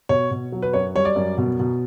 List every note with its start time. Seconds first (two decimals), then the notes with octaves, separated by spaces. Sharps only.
0.09 B2 C#5
0.31 B2
0.52 F#3
0.62 B4
0.73 F#2 C#5
0.95 G3 C#5
1.05 D5
1.16 F#2
1.38 B2
1.60 B2